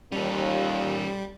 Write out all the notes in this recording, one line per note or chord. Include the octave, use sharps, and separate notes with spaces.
D#2 A#2 G3 C#4 A4